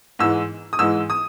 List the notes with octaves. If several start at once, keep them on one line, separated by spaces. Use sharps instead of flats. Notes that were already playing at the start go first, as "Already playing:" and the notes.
G#2 E3 G#3 E6
D#6
G#2 E3 G#3 E6
D#6